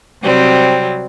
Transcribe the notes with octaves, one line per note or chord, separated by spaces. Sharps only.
C3 F#3 G3 C4